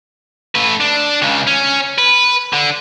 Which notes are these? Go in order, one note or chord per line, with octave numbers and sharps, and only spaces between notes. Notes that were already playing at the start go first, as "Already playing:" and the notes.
A3 B4
D4
C#2 C#3
C#4
B4
D3